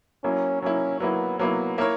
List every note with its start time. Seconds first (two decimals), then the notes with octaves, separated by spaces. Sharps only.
0.24 F#3 A#3 C#4 E4
0.62 F#3 A#3 C#4 E4
1.00 F#3 A#3 B3 E4
1.39 F#3 A#3 B3 E4
1.78 A#3 E4 A#4 C#5